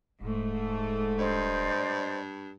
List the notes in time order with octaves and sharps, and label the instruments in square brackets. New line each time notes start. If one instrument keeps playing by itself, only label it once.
[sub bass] D#1 [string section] G#2 A3
[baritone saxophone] G2 [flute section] C5 D5 D#5